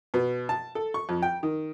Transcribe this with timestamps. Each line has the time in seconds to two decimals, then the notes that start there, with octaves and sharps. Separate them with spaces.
0.14 B2
0.49 A5
0.75 A4
0.94 C#6
1.09 F2
1.22 G5
1.43 D#3